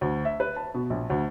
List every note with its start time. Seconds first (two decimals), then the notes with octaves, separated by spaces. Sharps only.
0.01 D2
0.25 E5
0.40 B4
0.56 A5
0.74 B2
0.90 A#1
1.10 D2